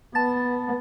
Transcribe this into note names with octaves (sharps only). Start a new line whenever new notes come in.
B3 A5 A6